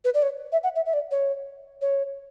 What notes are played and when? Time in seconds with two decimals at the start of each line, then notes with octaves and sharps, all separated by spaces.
0.05 B4
0.14 D5
0.22 C#5
0.52 E5
0.64 F#5
0.76 E5
0.86 E5
0.93 D5
1.11 C#5
1.82 C#5